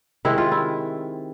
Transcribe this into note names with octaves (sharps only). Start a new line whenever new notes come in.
C3 D#3 G#3 E4
F4
E4